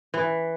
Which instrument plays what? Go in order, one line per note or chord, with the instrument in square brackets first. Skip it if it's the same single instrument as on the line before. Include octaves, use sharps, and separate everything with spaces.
[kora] E3